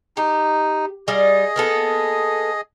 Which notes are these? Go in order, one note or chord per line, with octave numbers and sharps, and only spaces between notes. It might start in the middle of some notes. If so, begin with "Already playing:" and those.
D#4 G4
G3 F4 G#4 D#5
A#3 B3 A4